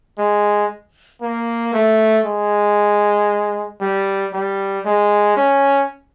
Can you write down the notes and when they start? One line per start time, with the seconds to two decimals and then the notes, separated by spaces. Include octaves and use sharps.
0.18 G#3
1.22 A#3
1.74 A3
2.26 G#3
3.81 G3
4.33 G3
4.85 G#3
5.37 C#4